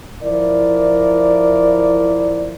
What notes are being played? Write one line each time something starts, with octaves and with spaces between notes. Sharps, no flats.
F3 E4 A#4 D5